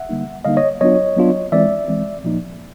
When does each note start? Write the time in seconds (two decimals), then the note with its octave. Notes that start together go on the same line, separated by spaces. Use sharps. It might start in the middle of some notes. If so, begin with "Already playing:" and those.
Already playing: E5 F#5
0.09 D3 G3 A#3 D#4
0.45 D3 G3 A#3 D#4 D#5 F5
0.57 C#5 D#5
0.81 F#3 B3 D4 F4 C#5 D#5
1.16 F#3 B3 D4 F4
1.52 E3 G#3 C4 D5 E5
1.88 E3 G#3 C4
2.24 A#2 F3 A#3 D#4